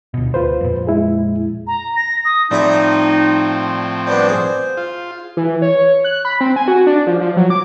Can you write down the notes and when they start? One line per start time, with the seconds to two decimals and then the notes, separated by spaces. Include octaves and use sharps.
0.14 D2 B2
0.34 D1 F4 B4 C5
0.61 F2 A#2
0.87 G#3 E4 G#4
1.67 A#5
1.96 A#6
2.25 D#6
2.51 A2 F3 G3 C4 D#4 G#4 E5
4.07 G3 B3 D4 C5
4.29 G#4
4.77 F4
5.37 E3
5.62 C#5
6.04 F#6
6.25 B5
6.41 C4
6.56 G#5
6.68 F#4
6.87 D4
7.07 F3
7.21 F3
7.37 F#3
7.50 D6